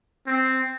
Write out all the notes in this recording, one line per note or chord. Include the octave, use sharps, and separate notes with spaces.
C4